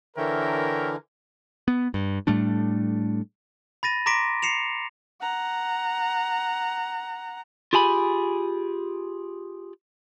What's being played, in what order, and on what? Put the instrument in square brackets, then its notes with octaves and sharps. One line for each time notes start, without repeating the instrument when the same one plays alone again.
[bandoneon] D3 E3 [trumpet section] A#4 [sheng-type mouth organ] C#5 E5 G5
[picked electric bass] B3
G2
A2 G3 A3 D4
[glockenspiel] B5 A6 A#6 D#7
A#5 C6 D6 A#6 B6 D7
C7 C#7 E7 F7
[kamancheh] F#5 A#5
[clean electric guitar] F4 G4 G#4 G#5 B5